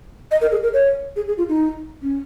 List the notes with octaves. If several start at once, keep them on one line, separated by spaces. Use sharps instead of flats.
D#5
A#4
G#4
A#4
C#5
G#4
G#4
F4
D#4
C#4